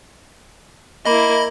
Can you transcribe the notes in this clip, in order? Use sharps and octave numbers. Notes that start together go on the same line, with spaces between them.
A#3 E4 D#5 B5